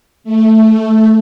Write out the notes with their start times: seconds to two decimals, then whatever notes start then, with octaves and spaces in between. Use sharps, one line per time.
0.24 A3